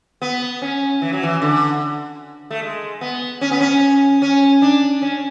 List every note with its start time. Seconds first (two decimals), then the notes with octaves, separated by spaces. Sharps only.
0.22 B3
0.62 C#4
1.02 E3
1.13 F#3
1.23 E3
1.42 D3
2.51 A3
2.62 G#3
3.01 B3
3.41 C#4
3.51 B3
3.60 C#4
4.22 C#4
4.62 D4
5.02 C#4